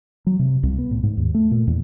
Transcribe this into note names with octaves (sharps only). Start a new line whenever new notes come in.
F#3
C3
C2
B3
A2
G#2
D#2
A3
A#2
E2